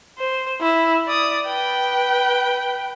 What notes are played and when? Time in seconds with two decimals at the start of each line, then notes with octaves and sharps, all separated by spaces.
0.19 C5
0.61 E4
1.08 D5 D#6
1.47 B4 G5